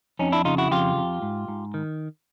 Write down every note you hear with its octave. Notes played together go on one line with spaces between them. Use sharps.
F2 C#4 D#4
D4 E4
C#3 D#4 F4
E4 F#4
F2 F4 G4
F2
G#2
G#2
D#3